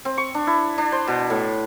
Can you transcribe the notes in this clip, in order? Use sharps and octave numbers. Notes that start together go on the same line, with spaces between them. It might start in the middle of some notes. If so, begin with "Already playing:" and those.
C4
C#6
D4
E4
D4
C5
B2
A2